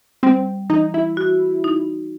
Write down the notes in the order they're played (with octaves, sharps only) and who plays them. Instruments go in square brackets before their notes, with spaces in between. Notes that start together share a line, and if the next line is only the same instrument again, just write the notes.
[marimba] G3 [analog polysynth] C4
[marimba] E3 [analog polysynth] D#4
[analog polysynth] E4
[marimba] F#4
D#4